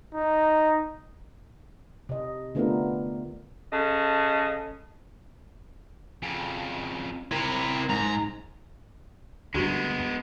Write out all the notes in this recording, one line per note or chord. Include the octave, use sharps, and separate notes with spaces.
D#4
C3 D#5
D3 A3 B3 D4 F4 A#4
C#3 A4 D#5
F2 C#3
C3 E4 A#4
G#2 A#5
D2 G2 G#3 B3 D4 F#4 G4